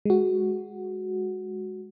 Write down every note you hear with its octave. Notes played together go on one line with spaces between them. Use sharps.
G#3 F#4